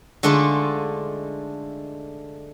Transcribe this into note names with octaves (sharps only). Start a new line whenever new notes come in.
D3 G#3 A3 D4 D#4 F4